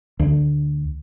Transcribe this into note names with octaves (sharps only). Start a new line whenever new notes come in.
D2